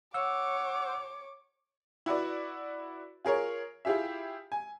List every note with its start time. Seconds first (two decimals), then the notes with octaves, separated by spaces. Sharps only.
0.14 C#5 F#5 D6 E6
2.06 E4 F#4 B4 D5
3.25 F4 G#4 A#4 C#5
3.85 E4 F4 G4 G#4 E5
4.52 G#5